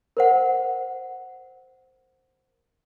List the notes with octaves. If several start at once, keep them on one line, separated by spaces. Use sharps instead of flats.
A#4 C5 F#5